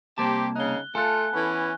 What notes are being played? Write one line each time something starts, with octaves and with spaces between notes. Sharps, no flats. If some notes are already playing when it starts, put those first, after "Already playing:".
C2 A#3 C4 G4 A5
C#3 D#4 F5 F#6 G7
A3 F4 A4 G#5 F#6
E3 B3 C#4